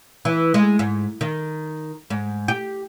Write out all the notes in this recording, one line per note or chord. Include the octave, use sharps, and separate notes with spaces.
E3
G#3
G#2
D#3
G#2
G4